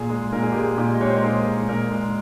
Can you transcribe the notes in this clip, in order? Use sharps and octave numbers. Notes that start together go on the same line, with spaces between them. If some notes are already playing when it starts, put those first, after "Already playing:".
Already playing: A#2 G#4
G#3
A#2 A#4
G#4
G#3 G4
G#4
A#2 G4
D#5
G#3 C#5
C5
A#4
A#2 G#4
G#3
A#2 A#4
G#3